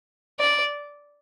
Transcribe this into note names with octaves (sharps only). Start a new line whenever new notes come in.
D5